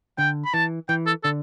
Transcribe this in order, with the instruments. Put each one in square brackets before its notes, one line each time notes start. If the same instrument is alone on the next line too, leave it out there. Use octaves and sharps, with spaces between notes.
[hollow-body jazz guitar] D3 [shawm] G5
[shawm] B5
[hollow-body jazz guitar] E3 [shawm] A5
[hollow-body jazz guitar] E3 [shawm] G5
[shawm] A4
[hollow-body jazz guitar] D3 [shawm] A4